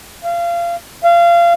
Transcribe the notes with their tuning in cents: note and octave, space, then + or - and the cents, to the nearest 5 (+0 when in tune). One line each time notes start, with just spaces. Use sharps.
F5 -25
F5 -25